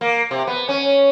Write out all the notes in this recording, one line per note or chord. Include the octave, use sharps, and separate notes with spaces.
A#3
C3
B3
C#4